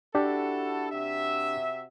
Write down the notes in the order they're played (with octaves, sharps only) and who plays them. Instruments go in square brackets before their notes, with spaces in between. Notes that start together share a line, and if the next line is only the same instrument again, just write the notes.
[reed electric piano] D4 G4 [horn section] E4 F#4 A4
[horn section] C3 F#4 E5